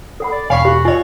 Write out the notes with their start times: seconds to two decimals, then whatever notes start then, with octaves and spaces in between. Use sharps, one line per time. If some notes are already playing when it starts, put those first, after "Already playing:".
0.20 A4 F#5 B5
0.32 D5
0.50 E1 C#5 F5 G#5 B5 C#6
0.65 F#4 G4
0.85 F4 C#5 D#5 G#5